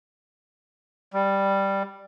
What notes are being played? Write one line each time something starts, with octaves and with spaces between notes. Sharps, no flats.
G3